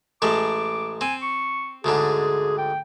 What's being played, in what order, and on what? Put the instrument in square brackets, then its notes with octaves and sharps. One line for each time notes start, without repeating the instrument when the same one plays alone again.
[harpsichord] A1 G#3 A3 [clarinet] D6
[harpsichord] C4 [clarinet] G#5
[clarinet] C#6
[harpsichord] D2 G#2 D3 [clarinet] G#4
[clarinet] G5